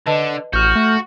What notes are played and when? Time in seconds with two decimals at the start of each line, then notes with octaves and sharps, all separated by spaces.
0.06 D3 B4 D#5 A5
0.53 A1 F#4 F6 G6
0.76 A3